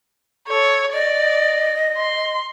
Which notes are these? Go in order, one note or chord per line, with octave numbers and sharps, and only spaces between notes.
A4 C#5
D5 D#5
C6